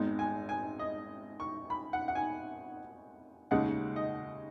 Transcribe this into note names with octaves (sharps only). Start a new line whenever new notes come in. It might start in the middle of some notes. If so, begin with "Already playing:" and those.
Already playing: G#1 G#2 G#3 B3 D#4
G#5
G#5
D#5
C#6
B5
F#5
F#5
G#5
D#2 C#3 G#3 D#4 F#5
D#5